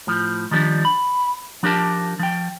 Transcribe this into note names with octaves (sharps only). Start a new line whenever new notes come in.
A2 F3
D#3 F3 G3 A3 D4
B5
F3 D4 G4 A#4 A5
F3 G5